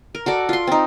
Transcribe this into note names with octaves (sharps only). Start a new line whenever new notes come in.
A#4
F#4 A4 D5
F4 C6
C4 D#4